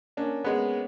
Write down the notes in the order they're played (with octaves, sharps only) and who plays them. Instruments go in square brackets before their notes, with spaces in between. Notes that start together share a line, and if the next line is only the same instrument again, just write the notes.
[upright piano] A#3 C#4 D4
[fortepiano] G#3 B3